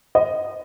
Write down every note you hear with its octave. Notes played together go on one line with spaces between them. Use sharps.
D#5